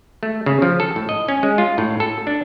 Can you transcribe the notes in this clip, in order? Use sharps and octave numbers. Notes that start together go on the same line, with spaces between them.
A3
C#3
F3
A4
A2
D#5
C#4
G#3
F4
A2
A4
D4